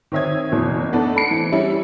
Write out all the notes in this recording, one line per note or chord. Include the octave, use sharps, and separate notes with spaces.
D#3 C4 C#5 E5 D#6 G#6
F#1 B2 E3
A3 B3 D4 D#4 A4
A4 B5 C#7
E3 C4
G3 C#4 E4